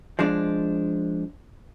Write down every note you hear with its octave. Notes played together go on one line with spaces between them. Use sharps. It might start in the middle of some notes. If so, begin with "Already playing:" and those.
F3 G#3 D4